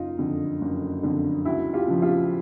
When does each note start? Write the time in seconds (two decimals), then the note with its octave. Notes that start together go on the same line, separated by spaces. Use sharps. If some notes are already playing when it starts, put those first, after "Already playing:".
Already playing: F#1 D#4 F4
0.18 F2 D3
0.61 F#1
1.03 F2 D3
1.45 C#2 E4 F#4
1.73 F4 G4
1.87 C#3 F3
2.02 F4 G4